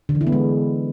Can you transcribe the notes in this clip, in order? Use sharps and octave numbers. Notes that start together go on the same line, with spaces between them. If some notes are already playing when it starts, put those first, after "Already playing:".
D3
E3
E4
B3
G#3